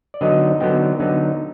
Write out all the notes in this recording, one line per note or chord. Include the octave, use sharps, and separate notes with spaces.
D5
D3 F#3 B3 D#4 D#5
D3 F#3 B3 D#4 G5
D3 F#3 B3 D#4